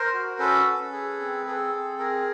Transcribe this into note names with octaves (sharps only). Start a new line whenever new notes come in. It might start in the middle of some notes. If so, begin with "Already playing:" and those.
Already playing: A#4 C5
F#4
C#4 A4 B4
C#4
G#4
C4
G#4 A4
C4
G#4 A#4